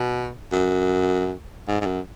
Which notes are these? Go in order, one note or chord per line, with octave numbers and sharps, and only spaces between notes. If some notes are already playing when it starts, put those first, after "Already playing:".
Already playing: B2
F#2
G#2
G#2
F#2